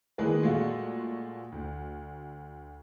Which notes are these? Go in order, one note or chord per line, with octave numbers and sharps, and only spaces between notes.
D#3 E3 G#3 A#3 G#4 B4
A#2 G#3 A3 F4 F#4
D2